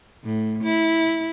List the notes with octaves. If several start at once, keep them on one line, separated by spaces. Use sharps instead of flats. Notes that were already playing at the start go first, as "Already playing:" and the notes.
A2
E4